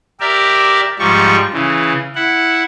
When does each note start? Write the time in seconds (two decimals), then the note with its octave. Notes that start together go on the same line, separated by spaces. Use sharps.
0.20 G4 A#4 D5 E5
0.99 G#2 F3 G3 C#6
1.53 C#3 E3
2.15 E4 F#5